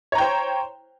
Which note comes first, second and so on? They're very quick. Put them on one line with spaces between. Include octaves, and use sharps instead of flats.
C#5 A#5 G5 C5